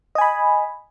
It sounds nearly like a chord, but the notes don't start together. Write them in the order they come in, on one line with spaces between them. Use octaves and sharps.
D#5 G#5 B5